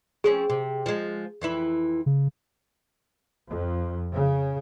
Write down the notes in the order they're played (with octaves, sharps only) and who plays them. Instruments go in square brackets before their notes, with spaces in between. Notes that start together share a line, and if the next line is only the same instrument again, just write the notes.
[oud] F3 C4 C#4 [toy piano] G#4
[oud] C3
F3 G#3
F2 E3 E4
[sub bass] C#3
[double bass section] F2
C#3